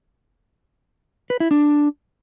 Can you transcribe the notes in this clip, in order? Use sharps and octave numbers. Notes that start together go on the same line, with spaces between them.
B4
E4
D4